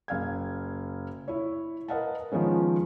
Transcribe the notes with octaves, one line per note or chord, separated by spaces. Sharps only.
F#1 F5 G#6
E4 C#5
A#4 B4 D#5 F5 F#5 A5
D#3 F3 G#3 B3 C#4